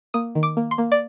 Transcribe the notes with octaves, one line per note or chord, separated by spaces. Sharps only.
A#3 D#6
D#3
D6
A#3
C6
A#3
D5